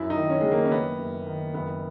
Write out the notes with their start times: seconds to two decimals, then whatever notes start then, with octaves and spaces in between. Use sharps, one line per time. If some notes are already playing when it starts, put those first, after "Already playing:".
Already playing: F#2 E4
0.10 D#4
0.17 D#3
0.30 C#4
0.41 D#3 G#3
0.52 A#3
0.65 C#4
0.72 F#1 B3
0.99 F#1
1.26 D#3
1.54 F#1 B3